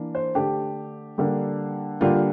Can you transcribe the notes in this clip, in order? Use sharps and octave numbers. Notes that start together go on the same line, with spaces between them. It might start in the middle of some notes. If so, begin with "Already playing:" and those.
Already playing: E3 A#3 D4
C5
D3 A3 D4 G4
D3 G3 A#3 D4
D3 G3 A#3 F4